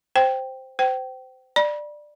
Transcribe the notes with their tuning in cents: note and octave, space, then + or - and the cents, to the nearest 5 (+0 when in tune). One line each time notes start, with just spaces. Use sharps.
C5 +0 G5 +0
C5 -25 G5 -25
D5 +15 B5 -40